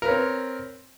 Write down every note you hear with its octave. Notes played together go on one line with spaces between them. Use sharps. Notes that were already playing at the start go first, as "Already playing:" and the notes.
C4 A#4 B4 C#5